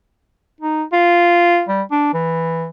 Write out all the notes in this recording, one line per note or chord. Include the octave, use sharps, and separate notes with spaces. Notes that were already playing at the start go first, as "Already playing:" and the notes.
D#4
F4
G3
D4
E3